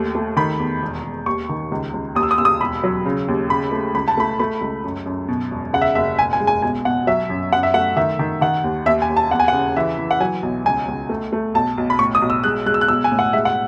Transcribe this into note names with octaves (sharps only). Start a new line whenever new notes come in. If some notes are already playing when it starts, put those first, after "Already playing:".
Already playing: D#2 A3
A3
D#3 B5
E2
E1
E1
D#2 C#6
D#3
C#2
C#2
D#2 D#6
E6
D#6
D#2 E6
D#6
E1 B5
F#3
C#3
D#2
C#3 B5
A3
C#2 B5
A5
A3 B5
A3 B5
C#2
F#2
F#2
B2
E1
C#3 F#5
E5
F#1 E5
E1 G#5
G#5
G#3
G#5
B1 G#5
B2 F#5
F#3 E5
F#2
F#2 F#5
E5
A3 F#5
D#3 E5
D#3
D#3 F#5
D#2
D#2 E5
G#5
D#2
A5
E2 F#5
G#5
F#5
C#3
E3 E5
E3
F#5
F#3 G#5
B1
C#2 G#5
C#2
A3
A3
B1 A5
B1
B5
A2 C#6
D#6
B1
E6
G#3 F#6
G#3 F#6
E6
F#6
B1 E6
G#5
A2
F#5
G#3 E5
F#5